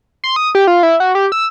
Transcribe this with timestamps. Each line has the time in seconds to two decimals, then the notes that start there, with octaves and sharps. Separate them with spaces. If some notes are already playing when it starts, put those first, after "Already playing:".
0.24 C6
0.36 D#6
0.55 G4
0.67 F4
0.83 E4
1.00 F#4
1.15 G4
1.32 E6